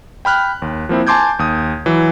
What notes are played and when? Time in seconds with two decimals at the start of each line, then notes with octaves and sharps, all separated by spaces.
0.25 G5 B5 F6 F#6
0.62 D#2
0.89 F3 A#3 C4 E4
1.07 G#5 A5 C6 D6 G6 G#6
1.39 D#2 D#6
1.86 E3 F#3